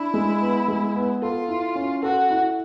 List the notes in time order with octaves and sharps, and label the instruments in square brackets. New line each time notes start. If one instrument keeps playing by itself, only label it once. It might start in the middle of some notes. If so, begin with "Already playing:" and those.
Already playing: [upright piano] D4 [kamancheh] E4
[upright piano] G#3
B3
G#3
B3
[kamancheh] F4 [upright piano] A4
[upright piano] E4
C#4
[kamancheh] F#4 [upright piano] A4
[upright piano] E4